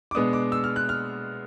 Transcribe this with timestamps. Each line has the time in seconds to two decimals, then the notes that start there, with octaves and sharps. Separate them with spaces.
0.11 D6
0.15 B2 G#3 B3 D4 D#6
0.33 D6
0.52 E6
0.64 F6
0.76 F#6
0.89 F6